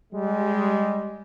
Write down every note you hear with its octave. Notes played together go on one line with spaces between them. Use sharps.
G3 G#3